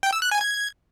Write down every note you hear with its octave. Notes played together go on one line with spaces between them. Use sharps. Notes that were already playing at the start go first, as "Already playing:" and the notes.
G5
E6
F#6
G#5
G#6